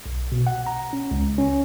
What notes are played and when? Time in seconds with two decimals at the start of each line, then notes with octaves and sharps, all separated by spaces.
0.06 B1
0.32 B2
0.47 F#5
0.67 A#5
0.93 C#4
1.11 C#2
1.38 C#4